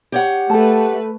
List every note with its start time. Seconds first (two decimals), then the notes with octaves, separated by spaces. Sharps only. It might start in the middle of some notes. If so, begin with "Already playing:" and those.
0.12 G4 C#5 F#5
0.50 A3 A4 B4 A5